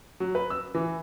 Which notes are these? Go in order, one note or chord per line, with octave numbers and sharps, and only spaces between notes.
F#3
B4
E6
E3